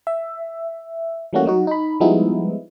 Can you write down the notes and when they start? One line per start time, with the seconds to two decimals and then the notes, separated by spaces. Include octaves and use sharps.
0.07 E5
1.33 E3 G3 A3 A#3 C#4 F#4
1.46 F#3 D#4 F#4
1.67 D#4 B5
2.00 F3 G3 G#3 B3 D#4 E4